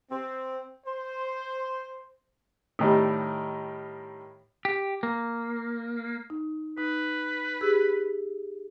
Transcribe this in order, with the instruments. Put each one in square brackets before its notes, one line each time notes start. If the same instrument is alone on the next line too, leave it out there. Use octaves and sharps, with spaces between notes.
[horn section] C4
C5
[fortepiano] A2 D#3 G3
[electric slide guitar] G4
A#3
[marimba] D#4
[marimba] D#4 [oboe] B4
[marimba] G4 G#4 E6